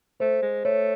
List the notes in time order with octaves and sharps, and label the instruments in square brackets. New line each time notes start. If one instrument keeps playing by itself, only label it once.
[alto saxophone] A3 [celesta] C5
[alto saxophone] G#3
[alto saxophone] A3 [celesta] C#5